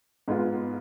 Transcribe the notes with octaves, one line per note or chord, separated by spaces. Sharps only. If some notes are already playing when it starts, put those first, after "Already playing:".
G#2 G#3 B3 F4